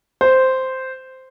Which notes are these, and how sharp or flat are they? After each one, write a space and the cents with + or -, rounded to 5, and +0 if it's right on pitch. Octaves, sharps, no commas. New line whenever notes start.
C5 -5